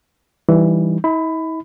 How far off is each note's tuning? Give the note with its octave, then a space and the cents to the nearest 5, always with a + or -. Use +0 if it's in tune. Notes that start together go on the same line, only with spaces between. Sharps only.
E3 +0 G3 +0 D#4 -10
E4 -45 B5 +20